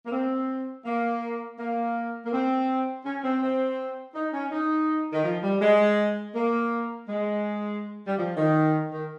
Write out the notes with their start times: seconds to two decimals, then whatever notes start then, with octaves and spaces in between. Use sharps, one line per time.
0.06 A#3
0.12 C4
0.85 A#3
1.58 A#3
2.25 A#3
2.32 C4
3.04 C#4
3.24 C4
3.42 C4
4.14 D#4
4.33 C#4
4.51 D#4
5.13 D#3
5.24 F3
5.43 G3
5.61 G#3
6.35 A#3
7.08 G#3
8.07 G3
8.18 F3
8.36 D#3
8.92 D#3